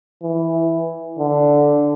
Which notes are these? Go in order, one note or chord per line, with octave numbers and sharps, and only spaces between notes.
E3
D3